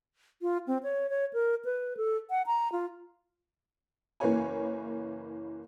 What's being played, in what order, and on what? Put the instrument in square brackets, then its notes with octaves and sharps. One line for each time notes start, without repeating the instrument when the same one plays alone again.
[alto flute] F4
C4
C#5
C#5
A#4
B4
A4
F#5
A#5
F4
[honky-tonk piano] F#1 E3 A#3 B4 C#5 G#5